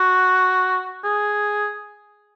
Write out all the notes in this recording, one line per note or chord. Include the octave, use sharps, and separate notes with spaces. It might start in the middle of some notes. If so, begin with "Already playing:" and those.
Already playing: F#4
G#4